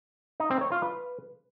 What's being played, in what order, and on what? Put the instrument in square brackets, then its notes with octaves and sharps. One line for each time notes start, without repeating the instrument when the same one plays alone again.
[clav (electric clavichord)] D#4
C4
C#5
F4
B4